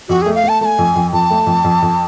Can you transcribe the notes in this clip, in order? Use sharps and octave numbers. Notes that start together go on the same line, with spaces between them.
F2 F#4
A3 G#4
F5
A3
A5
A3 G#5 A5
F2
F2
F2 A5
A3
F2
F2
F2